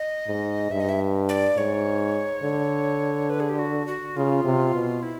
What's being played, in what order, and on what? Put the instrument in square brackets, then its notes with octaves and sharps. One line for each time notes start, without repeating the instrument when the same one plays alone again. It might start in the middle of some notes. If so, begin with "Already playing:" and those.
Already playing: [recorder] D#5
[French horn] G#2
[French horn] G2 [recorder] E5
[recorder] D#5
E5
D5
[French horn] G#2 [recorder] C#5
[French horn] D3
[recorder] B4
G#4
G4
F#4
F#4
[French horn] C#3 [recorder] F4
[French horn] C3
B2
[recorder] E4